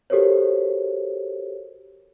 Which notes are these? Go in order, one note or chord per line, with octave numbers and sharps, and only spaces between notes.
F#4 G4 A4 A#4 C5 C#5